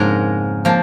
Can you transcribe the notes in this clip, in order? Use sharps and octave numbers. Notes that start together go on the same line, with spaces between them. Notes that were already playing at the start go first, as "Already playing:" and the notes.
Already playing: F2 G#2 C#3 G#3 A#3 A#4
F3 A#3